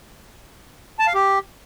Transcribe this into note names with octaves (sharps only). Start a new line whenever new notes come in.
A5
F5
G4